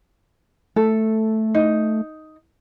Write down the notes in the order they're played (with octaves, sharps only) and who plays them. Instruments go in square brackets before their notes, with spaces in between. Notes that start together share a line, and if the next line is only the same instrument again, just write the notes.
[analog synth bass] A3 [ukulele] A4
[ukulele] D#4